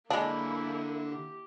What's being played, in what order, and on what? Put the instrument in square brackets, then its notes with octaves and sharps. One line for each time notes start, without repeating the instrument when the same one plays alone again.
[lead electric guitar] D3 B5 [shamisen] G#3 D4 [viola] A#3 E4
[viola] G4